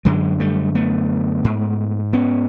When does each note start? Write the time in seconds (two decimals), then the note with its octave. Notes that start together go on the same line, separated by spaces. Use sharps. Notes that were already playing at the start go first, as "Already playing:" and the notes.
0.05 F#2 D3 F#3 G#3
0.40 G3 A3
0.75 A3 B3
1.44 G#2
2.13 B3 C#4